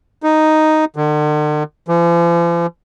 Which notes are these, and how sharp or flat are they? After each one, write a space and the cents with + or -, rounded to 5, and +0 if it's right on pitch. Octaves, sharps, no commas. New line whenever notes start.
D#4 +0
D3 +45
F3 -45